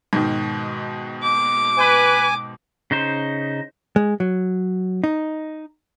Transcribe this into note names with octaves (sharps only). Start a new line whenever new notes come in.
G#2 B2 D#3
D6
B4 G#5
C#3 D#4 C5
G#3
F#3
D#4